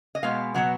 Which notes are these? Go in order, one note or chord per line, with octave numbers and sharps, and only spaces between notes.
D#5
B2 G#3 B3 F5
B2 F#3 B3 F#5